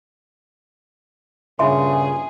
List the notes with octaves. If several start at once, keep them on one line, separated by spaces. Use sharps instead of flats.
G2 A#2 C#3 F4 G#4 E5 C6